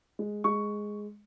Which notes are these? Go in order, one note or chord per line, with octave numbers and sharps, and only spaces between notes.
G#3
G#3 C#6